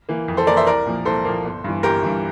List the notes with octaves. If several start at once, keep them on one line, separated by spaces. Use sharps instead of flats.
E3 A#3
F2
A4 C5
E3 A#3 A#4 D5
C5 E5
C2 A#4 D5
A#2 F3 A#3
C2 A4 C5
A#2 F3 A#3
G1
G2 E3
G1 G4 A#4
G2 E3